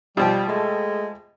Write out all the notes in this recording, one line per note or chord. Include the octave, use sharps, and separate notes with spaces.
B2 F3 G3 G4
G#3 A3